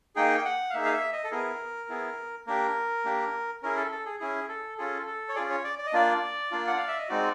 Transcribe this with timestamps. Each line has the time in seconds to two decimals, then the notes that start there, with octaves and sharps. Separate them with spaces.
0.16 A#3 D#4 G#4 G5
0.38 G5
0.45 F#5
0.70 F5
0.74 A#3 D#4 G#4 E5
0.85 F5
0.93 E5
1.13 D#5
1.24 A4
1.31 B3 E4 G#4 A#4
1.89 B3 E4 G#4
2.47 A#3 D4 G4 A#4
3.05 A#3 D4 G4
3.63 C#4 E4 G#4 A#4
3.77 A4
3.91 A4
4.06 G#4
4.20 C#4 E4 G#4
4.49 A4
4.78 C#4 F4 G#4 A4
5.07 A4
5.29 C#5
5.36 C#4 F4 G#4 D5
5.50 C#5
5.64 D5
5.79 D5
5.87 D#5
5.93 A#3 D4 F4 D5
6.51 A#3 D4 F4
6.67 F#5
6.77 F5
6.88 E5
6.98 D#5
7.08 G#3 C4 D#4 F#4 D5